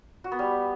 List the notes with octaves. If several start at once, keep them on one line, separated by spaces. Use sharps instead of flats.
F#4
B3
G3